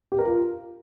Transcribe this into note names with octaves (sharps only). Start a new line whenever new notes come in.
G4
A#4
F4